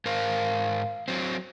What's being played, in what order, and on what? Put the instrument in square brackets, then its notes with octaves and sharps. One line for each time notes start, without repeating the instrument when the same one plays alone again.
[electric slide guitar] G#2 A#4 C5 [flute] F5
[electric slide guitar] F#3 C4